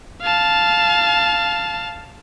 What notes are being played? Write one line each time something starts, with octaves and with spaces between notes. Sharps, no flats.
F5 A5